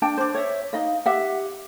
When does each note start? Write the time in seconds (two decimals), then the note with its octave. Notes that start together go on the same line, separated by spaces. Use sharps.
0.02 D4 G5 A5
0.17 D4 C5
0.34 C#5 E5
0.73 D#4 D#5 F5
1.06 G4 E5 F#5